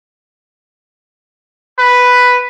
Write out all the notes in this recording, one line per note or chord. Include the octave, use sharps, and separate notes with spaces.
B4